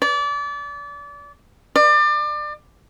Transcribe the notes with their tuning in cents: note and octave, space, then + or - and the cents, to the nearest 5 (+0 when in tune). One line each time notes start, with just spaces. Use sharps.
D5 -30
D5 +30